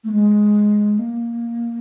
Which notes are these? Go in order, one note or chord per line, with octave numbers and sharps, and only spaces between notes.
A3
G#3
A#3